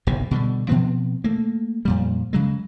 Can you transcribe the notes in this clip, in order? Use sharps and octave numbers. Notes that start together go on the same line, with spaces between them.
F#1 B1 A2 C3
B2 D3 F3 G3
B2 F3 B3 C4
A3 A#3
F2 A#2 G3
C#3 F#3 G#3